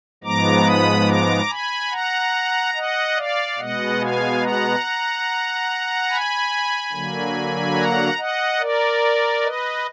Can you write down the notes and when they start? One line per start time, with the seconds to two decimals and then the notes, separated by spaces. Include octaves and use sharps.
0.24 G#2 F3 G#3 B3 A#5 D6
0.65 B5 D#6
1.07 A#5 D6
1.49 G#5 B5
1.91 F#5 A#5
2.74 D#5 F#5
3.16 D5 F5
3.58 B2 G#3 B3 D#5 F#5
4.00 F5 G#5
4.41 F#5 A#5
6.09 G#5 B5
6.92 D3 F#3 A#3
7.76 F#5 A#5
8.18 D#5 F#5
8.60 A#4 D5
9.43 B4 D#5